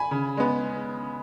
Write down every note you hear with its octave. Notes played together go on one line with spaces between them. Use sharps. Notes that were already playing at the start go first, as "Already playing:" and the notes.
Already playing: G#5 B5
C#3
G#3 B3